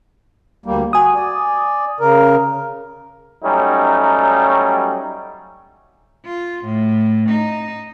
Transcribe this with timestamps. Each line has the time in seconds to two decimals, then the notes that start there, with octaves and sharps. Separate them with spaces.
0.66 D2 G3 A#3
0.93 F#4 G#5 D#6
1.14 D5
2.00 C#3 A#4
3.44 F#3 G3 A3 C#4 D#4
6.26 F4
6.65 A2
7.30 D#4